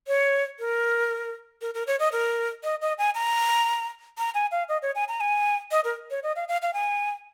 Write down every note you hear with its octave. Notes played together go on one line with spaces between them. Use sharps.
C#5
A#4
A#4
A#4
C#5
D#5
A#4
D#5
D#5
G#5
A#5
A#5
G#5
F5
D#5
C#5
G#5
A#5
G#5
D#5
A#4
C#5
D#5
F5
F5
F5
G#5